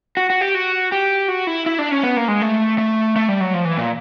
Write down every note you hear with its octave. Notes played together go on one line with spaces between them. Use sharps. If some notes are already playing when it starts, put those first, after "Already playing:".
F#4
F#4
G4
F#4
G4
F#4
E4
E4
D4
C#4
B3
A#3
G#3
A3
A3
A3
G3
F#3
F3
E3
A#2